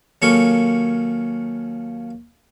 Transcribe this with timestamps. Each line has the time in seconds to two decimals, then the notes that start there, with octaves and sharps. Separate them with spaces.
0.22 D#2 F#3 A#3 C#4 A4 C#6